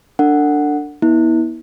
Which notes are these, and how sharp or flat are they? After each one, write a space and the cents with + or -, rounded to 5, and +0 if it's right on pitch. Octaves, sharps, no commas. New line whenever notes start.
D4 +0 A4 +45 F#5 +0
B3 -30 E4 -35